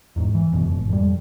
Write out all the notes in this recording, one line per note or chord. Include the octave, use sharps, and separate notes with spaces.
E2 G#2
E3
F1 C#2 F#2 B2
G#1
F2 G3